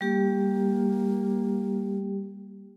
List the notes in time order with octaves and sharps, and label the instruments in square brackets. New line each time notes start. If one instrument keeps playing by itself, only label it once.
[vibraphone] G3 G4 [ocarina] A#3